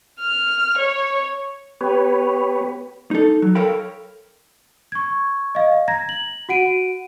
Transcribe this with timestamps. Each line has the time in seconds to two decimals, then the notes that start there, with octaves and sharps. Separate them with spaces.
0.20 F6
0.78 C#5
1.81 B3 G4 B4 C#5
3.11 D#4 A4
3.42 F#3
3.55 A4 A#4 C#5 F5 G5 B5
4.92 C#6 G#6
5.55 D#5 F5
5.88 A#5 G#6 A#6
6.09 F#7
6.49 F#4 F#5 D7 D#7